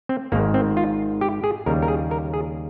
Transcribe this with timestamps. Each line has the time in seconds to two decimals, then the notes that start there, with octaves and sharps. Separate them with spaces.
0.09 C4
0.32 G#1 G#2 D#3 A#3
0.54 C4
0.77 F4
1.21 G4
1.44 G#4
1.66 D#2 C#3 G3 A#4
1.82 A#4
1.88 G#4
2.11 A#4
2.34 G#4